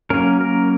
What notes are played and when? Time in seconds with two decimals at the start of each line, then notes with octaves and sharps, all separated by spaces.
0.10 F#3 A#3 C#4 A#4
0.41 A#4